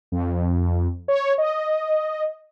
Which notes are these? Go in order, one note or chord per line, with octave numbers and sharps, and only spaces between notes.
F2
C#5
D#5